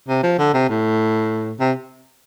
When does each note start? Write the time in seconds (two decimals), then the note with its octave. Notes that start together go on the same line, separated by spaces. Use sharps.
0.08 C3
0.23 F3
0.39 D3
0.54 C3
0.69 A2
1.60 C3